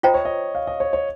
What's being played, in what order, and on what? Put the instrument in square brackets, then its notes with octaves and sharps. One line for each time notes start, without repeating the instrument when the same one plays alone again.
[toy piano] F4 C5 G5 A#5 [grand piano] D#5
[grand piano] C#5
D#5
F5
D#5
C#5
C#5